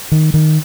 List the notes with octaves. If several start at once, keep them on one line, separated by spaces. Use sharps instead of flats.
D#3
D#3